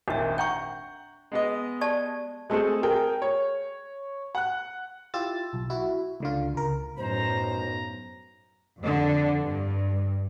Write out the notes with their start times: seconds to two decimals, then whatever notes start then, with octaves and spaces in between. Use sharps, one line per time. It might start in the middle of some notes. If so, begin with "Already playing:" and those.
0.08 G#1 D#2 A#2 D4 E5
0.38 F#5 G5 A#5 C#6 G6
1.32 G#3 B3 D#5
1.81 G4 D5 A5
2.50 G#3 A3 C4 G#4 A4
2.83 G#4 A#4 G5
3.22 C#5
4.35 F#5 F#6
5.14 E4 F4 G4 E6 A6
5.53 B1
5.70 E4 F#4
6.20 C#2 D3 F4
6.55 C#2 A#4
6.97 B1 F#2 A2 C5 A#5
8.79 F2 D3
9.39 G2